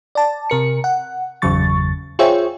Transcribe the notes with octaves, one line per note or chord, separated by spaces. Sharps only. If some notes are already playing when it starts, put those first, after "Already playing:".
D5 A5
C3 A#4 C#7
F#5
G1 E2 C#3 F#3 C#6 A6
F4 G#4 C5 C#5 E5 G5